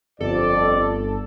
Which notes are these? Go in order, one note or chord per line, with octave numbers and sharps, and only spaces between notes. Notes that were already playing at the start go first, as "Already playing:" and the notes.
G1 F2 A4 D5